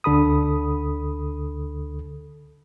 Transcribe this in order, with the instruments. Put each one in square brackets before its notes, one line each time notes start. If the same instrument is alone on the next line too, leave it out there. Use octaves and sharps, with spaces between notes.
[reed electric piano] D2 D3 A4 B5 D#6